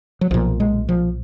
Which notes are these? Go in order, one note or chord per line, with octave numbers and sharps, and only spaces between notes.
F#3
B1 A#2 F3
G#3
F3